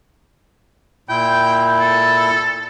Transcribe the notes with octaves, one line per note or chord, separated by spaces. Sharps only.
A#2 E4 G5
A4